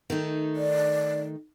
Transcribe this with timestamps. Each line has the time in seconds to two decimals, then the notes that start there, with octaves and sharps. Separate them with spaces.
0.10 D#3 A3 D#4
0.56 D5